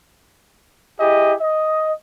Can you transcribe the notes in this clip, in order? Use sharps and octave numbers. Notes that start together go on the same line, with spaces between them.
E4 G4 G#4 D#5
D#5